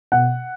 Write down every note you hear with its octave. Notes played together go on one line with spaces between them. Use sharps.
B2 F#5